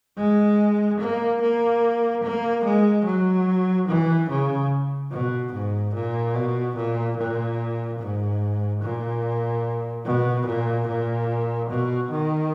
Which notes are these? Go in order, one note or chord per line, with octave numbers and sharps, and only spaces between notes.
G#3
A#3
A#3
A#3
G#3
F#3
E3
C#3
B2
G#2
A#2
B2
A#2
A#2
G#2
A#2
B2
A#2
A#2
B2
D#3